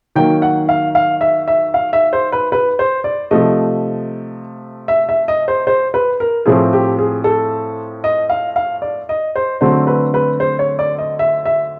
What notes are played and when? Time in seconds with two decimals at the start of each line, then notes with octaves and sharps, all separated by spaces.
0.15 D#3 F#3 A#3 G5
0.42 F#5
0.69 F5
0.95 F5
1.21 E5
1.48 E5
1.74 F5
1.93 E5
2.13 C5
2.32 B4
2.52 B4
2.79 C5
3.04 D5
3.31 C3 F3 A3 D#5
4.88 E5
5.09 E5
5.28 D#5
5.48 C5
5.67 C5
5.94 B4
6.20 A#4
6.46 A2 F3 A3 C4 G#4
6.73 G4
6.99 G#4
7.24 A4
8.04 D#5
8.30 F5
8.56 F5
8.82 D5
9.09 D#5
9.36 C5
9.61 D3 F#3 A3 C4 C5
9.87 B4
10.14 B4
10.40 C5
10.59 C#5
10.79 D5
10.98 D#5
11.19 E5
11.46 E5